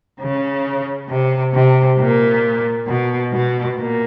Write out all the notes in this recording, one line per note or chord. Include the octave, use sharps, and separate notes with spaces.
C#3
C3
C3
A#2
B2
B2
A#2